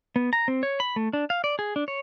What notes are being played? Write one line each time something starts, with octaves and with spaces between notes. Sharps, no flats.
B3
A#5
C4
C#5
B5
A3
D4
F5
D5
G#4
D4
C#5